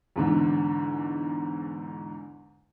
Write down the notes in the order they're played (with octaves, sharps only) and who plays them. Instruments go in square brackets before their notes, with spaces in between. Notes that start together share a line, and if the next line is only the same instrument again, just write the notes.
[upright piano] E2 G#2 D3